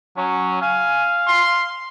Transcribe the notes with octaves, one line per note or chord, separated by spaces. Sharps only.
F#3 C#4
F5 G#5
C6